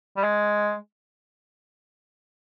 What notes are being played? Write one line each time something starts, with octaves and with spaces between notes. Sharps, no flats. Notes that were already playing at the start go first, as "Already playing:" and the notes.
G3
G#3